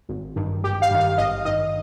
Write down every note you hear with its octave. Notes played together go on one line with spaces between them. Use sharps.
G#1
G2 D#3
G#1 G4
F5
G2 D#3
F5
G#1 D#5
G2 D#3 D#5